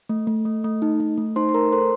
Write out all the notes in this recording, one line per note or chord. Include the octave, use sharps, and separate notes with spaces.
A3
A3
A3
A3
D#4
A3
A3
D#4 C5 C6
C6
A3 A#4 A#5
A4 C5 C6